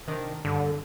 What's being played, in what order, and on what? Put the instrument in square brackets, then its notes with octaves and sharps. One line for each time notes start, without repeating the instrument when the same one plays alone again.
[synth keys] C3 D#3 D4
[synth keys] G2 [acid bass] D3